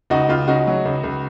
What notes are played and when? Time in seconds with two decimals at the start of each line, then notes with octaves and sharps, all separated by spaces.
0.10 C#2 D#4 F#4
0.29 C#2 F4
0.48 C#3 D#4 F#4
0.67 F#3
0.85 C#2
1.04 C#2